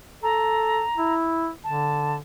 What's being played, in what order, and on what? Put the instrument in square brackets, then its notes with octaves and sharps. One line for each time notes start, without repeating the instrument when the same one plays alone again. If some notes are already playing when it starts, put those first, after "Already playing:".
[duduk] A4 [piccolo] A#5
[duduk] E4
[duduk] D3 [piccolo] A5